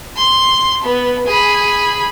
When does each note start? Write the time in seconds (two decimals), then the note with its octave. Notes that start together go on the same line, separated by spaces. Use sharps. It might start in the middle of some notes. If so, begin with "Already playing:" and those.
0.16 C6
0.83 B3
1.26 G#4 B5